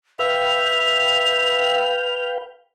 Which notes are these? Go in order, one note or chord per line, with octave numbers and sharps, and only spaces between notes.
B4 E5 F5 G5 F7